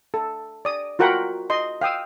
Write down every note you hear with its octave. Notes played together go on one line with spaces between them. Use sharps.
A4
D5 D#6
F4 F#4 A#4 F#5 G5 B5
D#5 C6
F5 G5 D#6 E6